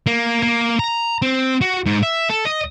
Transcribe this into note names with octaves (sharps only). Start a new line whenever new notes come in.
A#3
A#3
A#5
C4
F#4
G#2
E5
A4
D#5